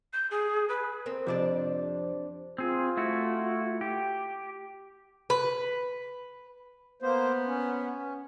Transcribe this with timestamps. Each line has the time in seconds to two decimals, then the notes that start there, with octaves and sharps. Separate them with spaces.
0.13 G6
0.31 G#4
0.69 B4
1.06 C4 A#4
1.27 F2 C3 F3 D4 G4 C5 D5
2.58 C4 F4 G#4
2.97 A3 E4 F#4
3.81 G4
5.30 B4
7.02 A#3 B3 C5
7.46 C#4